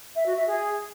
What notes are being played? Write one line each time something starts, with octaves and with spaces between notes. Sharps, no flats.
E5
F#4
E5
G#4